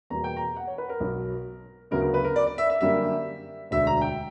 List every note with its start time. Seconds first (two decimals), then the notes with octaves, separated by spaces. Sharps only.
0.10 E2 B2 G3 A#3 A#5
0.24 G5
0.37 A#5
0.56 F#5
0.67 C#5
0.78 B4
0.89 A#4
1.00 B1 B2 F#3
1.91 D2 C#3 F#3 B3 A#4
2.02 A#4
2.14 B4
2.24 A#4
2.36 D5
2.47 D5
2.58 E5
2.70 E5
2.81 F#2 D3 G3 A#3 E5
3.71 E1 D2 D3 E5
3.87 A#5
4.01 G5